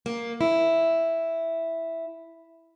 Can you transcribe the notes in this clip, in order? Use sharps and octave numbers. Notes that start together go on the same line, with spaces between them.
A#3
E4